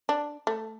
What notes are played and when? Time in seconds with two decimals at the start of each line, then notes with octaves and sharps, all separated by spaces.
0.09 D4
0.47 A3